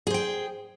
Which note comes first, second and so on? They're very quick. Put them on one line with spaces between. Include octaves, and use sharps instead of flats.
G#4 C5 G5